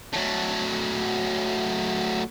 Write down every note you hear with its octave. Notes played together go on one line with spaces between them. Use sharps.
F#3 A3